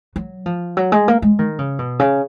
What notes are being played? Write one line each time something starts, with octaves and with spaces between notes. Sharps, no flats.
F#3
F3
F#3
G#3
A#3
G#3
D#3
C#3
B2
C#3